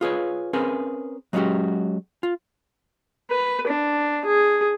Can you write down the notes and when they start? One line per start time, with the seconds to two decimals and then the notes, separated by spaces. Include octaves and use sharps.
0.01 F4 G#4 B4 C#5
0.53 C4 C#4 G#4 A#4 B4
1.33 F#3 G#3 B3 C#4 F#4 G4
2.23 F4
3.31 B4
3.67 D4
4.26 G#4